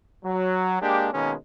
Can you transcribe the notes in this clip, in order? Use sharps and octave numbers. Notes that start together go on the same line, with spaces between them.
F#3
G#3 A#3 D4 G4
B2 D#3 G#3 A#3 C#4